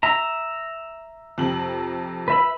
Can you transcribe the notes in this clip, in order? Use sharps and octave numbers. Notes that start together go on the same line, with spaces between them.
E5 A#5
F2 C3 F#7
B4 E5 B5